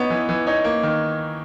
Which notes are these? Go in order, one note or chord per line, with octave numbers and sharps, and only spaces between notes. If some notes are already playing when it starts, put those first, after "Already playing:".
Already playing: B3 D#4 C#5
E3
E3
D#4 C#5
A#3
D#3